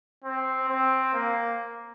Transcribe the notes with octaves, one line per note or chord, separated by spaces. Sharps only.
C4
C4
A#3